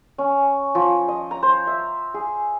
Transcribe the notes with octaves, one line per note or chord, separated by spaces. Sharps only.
C#4
F3
D#5
A#5
C5
E5
G#4